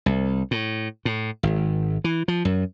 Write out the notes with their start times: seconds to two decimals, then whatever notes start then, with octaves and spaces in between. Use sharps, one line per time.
0.06 C2
0.51 A2
1.05 A2
1.43 G#1
2.04 E3
2.28 F3
2.45 F#2